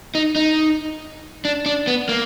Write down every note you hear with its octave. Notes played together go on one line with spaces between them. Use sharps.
D#4
D#4
D4
D4
B3
A#3